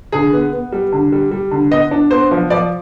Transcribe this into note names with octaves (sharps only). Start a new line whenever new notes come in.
D3 G#4
B3
B3
G3
D3
G3
G3
D3
B3 D#5
D4
B3 C5
F3
F3 D5